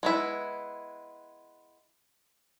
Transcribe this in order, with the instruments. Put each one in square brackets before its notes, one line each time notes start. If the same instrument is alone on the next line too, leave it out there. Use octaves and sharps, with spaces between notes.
[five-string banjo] G#3 B3 E4